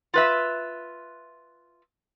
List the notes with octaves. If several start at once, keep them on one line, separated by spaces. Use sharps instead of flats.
F4 B4 E5